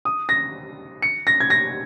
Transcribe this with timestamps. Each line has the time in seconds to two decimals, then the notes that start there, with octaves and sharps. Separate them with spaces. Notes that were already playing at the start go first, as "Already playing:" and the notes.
0.05 D#6
0.29 A#6
1.02 C#7
1.27 A#6
1.40 G#6
1.50 A#6